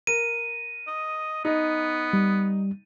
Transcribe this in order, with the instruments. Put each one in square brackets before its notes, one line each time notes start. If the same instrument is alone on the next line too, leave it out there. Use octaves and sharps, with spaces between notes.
[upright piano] A#4 [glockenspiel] D#7
[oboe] D#5
[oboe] B3 [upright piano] D#4
[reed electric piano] G3